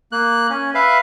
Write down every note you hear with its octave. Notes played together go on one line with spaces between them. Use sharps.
A#3 F#6
C#4
B4 E5 F5